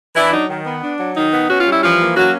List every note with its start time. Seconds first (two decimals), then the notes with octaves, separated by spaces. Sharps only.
0.15 E3 D4 E4
0.32 F#3 D#4
0.49 D#3
0.65 B3
0.82 D4
0.98 F#3
1.16 D#3 D#4
1.32 B3
1.50 C#4 F#4
1.60 F4
1.65 G3
1.72 E4
1.83 E3 F3 F4
1.99 A#3
2.16 F#3 C#4 F#4